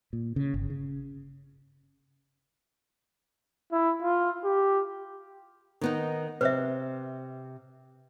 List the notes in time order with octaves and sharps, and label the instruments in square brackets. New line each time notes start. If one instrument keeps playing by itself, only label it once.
[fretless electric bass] A#2
C#3
G1
C#3
[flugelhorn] E4
F4
G4
[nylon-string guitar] D#3 B3 D#4
[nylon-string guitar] C3 [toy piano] B4 C5 E5